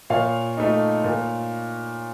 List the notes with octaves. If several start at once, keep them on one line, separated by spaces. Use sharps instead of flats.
A#2 C#5 F5
A3 D#4
A#2